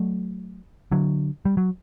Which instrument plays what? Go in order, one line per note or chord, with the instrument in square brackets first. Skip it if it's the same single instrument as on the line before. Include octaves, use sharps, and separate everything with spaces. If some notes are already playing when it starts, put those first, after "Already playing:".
Already playing: [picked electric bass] F#3 A3
D3 F#3
G3
F#3